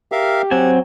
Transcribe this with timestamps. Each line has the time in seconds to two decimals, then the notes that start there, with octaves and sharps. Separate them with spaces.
0.12 G4 A#4 E5 F5
0.51 F#3 C4 F#5 G#5